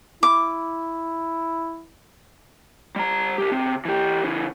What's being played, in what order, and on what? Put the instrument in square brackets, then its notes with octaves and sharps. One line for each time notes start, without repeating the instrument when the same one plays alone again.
[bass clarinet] E4 [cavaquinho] D6
[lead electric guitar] G3 A#5
C2 G4
C#3 C4
E3 G4
C#3 E3